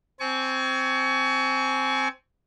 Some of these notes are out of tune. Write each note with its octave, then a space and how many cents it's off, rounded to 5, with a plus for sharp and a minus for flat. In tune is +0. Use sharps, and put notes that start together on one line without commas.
C4 +0 G#5 +25 C#6 +25